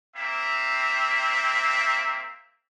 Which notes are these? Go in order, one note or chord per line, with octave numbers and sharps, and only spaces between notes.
A#3 C4 E5